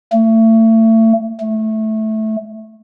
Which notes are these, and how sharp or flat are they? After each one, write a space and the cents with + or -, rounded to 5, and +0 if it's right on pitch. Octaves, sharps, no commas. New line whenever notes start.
A3 +30
A3 -10